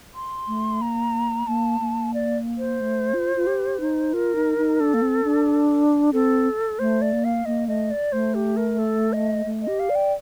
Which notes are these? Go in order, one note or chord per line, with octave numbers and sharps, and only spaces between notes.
C6
A3
A#3 A#5
A#3 A5
A#3
D5
C5
A3
F4
F4
G4
D#4
F4 A#4
D#4
D#4
D4 A4
A#3
C4
D4
C4 A4
A3 C5
D5
A#3
F5
A#3 D#5
A3 D#5
D5
A3 C5
G4
A#4
A4
D#5
A3
D#5
G4
F5
D5
G5